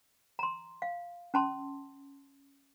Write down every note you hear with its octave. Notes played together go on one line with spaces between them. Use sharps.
A#5 C6
F5
C#4 A5 C6